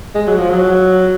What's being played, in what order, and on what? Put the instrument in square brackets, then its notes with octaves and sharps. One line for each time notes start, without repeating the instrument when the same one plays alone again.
[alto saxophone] G#3
F#3
F3
F#3